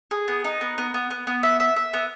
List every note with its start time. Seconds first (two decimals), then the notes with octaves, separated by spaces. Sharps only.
0.11 G#4
0.28 B3
0.44 D#4
0.61 B3
0.78 B3
0.94 B3
1.10 B3
1.27 B3
1.43 E5
1.60 E5
1.76 E5
1.93 B3